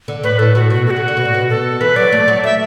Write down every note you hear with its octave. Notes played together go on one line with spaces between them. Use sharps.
D3
A2 B4
A2 A4
A2 F#4
B2 F#4
A4
F#4
D3
D3
B2
A2
B2
A4
E3 B4
F#3 D5
A3
F#3
A3 E5